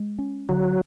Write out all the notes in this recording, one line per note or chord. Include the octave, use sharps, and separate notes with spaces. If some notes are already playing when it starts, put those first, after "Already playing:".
Already playing: G#3
C#4
D3 F#3